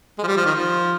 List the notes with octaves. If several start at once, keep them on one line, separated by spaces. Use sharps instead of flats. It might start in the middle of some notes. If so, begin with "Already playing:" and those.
G#3
F3
G3
F3
D#3
F3